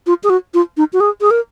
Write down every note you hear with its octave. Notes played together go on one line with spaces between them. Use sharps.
F4
G#4
F#4
F4
D#4
F#4
G#4
G#4
A#4